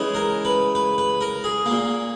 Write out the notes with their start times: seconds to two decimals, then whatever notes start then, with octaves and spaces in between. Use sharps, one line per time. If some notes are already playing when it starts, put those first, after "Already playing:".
Already playing: C#3 E3 G#3
0.15 A#4
0.45 B4
0.75 B4
0.98 B4
1.21 A#4
1.44 G#4
1.66 A#3
1.71 A#2